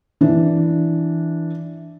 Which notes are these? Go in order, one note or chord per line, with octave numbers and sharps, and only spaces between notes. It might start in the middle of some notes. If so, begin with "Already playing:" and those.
E3 D4